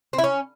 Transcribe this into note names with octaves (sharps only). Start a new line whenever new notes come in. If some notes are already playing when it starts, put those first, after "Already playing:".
C4
E4
C#4